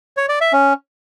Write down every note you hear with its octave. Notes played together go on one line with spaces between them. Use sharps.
C#5
D5
E5
C#4